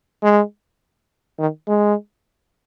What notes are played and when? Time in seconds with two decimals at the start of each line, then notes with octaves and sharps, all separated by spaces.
0.23 G#3
1.39 D#3
1.68 G#3